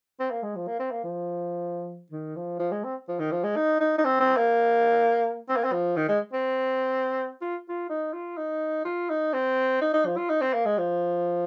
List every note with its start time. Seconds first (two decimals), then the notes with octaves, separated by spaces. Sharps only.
0.20 C4
0.31 A#3
0.43 G#3
0.56 F3
0.67 A#3
0.79 C4
0.91 A#3
1.04 F3
2.12 D#3
2.36 F3
2.60 F3
2.72 G#3
2.84 C4
3.08 F3
3.19 D#3
3.31 F3
3.44 G#3
3.56 D#4
3.80 D#4
3.98 D#4
4.05 C4
4.20 C4
4.37 A#3
5.49 C4
5.56 A#3
5.64 C4
5.73 F3
5.96 D#3
6.08 G#3
6.33 C4
7.41 F4
7.69 F4
7.89 D#4
8.13 F4
8.37 D#4
8.85 F4
9.10 D#4
9.34 C4
9.81 D#4
9.93 D#4
10.06 F3
10.17 F4
10.29 D#4
10.41 C4
10.54 A#3
10.65 G#3
10.78 F3